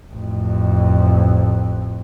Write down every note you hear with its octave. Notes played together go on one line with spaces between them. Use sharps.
A1 F2